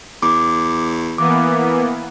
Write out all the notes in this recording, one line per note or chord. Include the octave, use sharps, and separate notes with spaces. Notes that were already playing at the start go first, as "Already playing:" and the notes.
E2 D6
E3 A#3 B3 D6